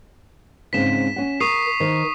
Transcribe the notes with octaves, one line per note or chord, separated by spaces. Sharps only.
G#2 C#3 C4 B6 E7
C#4 F#5
A#4 C#6 D#6 C7
D#3 C5